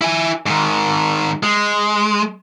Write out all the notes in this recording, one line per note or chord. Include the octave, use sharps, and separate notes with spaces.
E4 G#5
G#2 D#3
G#3